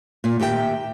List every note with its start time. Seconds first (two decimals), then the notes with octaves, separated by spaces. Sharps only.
0.24 A#2
0.40 D#2 G4 E5 G5